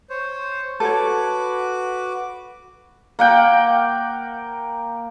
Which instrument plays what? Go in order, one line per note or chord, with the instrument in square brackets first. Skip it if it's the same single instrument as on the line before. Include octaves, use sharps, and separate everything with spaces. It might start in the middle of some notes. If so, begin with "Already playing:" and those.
[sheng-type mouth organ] C5 C#5
[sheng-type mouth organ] F#4 B4 D6 [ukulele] A4 C#5
[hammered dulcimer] A#3 F#5 G5